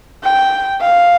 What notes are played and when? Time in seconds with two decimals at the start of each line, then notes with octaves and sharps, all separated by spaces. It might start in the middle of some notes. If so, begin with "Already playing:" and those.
0.24 G5
0.81 F5